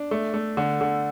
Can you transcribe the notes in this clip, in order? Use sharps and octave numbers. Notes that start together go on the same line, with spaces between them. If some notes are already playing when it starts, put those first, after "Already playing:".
Already playing: D4
A3
A3
D3
D3